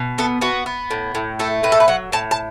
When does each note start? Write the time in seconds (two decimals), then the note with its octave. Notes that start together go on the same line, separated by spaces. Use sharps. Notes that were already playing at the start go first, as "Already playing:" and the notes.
Already playing: B2
0.18 B3 A4
0.41 B3 F#4
0.66 B3
0.91 A2
1.15 A2
1.39 A3 A4
1.63 A2 B4
1.72 A4
1.80 B4
1.88 F#3 F#5
2.12 A2 A5
2.31 A5